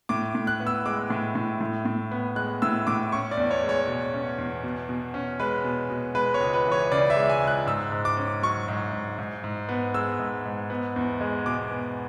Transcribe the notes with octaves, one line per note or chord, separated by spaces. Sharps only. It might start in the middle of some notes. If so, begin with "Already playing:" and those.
A2 D6
A2
F#6
B3
E6
G#3 D6
A2
A2
A2
A2
B3
G#3 F#6
A2 E6
A2 D6
C#4 C#6
D5
E2
C#5
G#3
C#5
B2
C#4
E2
B2
B2
C#4
G#3 B4
B2
B2
G#3 B4
C#5
C#2
B4
E3
C#5
C#3 D5
E5
G#3
G#5
C#2
F#6
G#2 E6
G#2
D6
C#4
F#3 C#6
G#2
G#2
G#2
G#2
B3
G#3 E6
G#2
G#2
B3
E2
G#3
B2 D6
B3